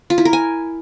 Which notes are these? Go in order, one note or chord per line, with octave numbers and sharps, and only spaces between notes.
F4
E4
A#4
G#5